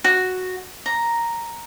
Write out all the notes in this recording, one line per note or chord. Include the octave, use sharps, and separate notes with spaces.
F#4
A#5